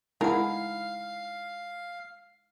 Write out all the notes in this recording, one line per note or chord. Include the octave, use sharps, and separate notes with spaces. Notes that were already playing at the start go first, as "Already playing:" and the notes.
G#3 D#4 E4 A#4 F5 F#5